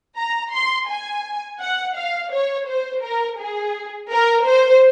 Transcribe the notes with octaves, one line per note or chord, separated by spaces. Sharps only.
A#5
C6
G#5
F#5
F5
C#5
C5
A#4
G#4
A#4
C5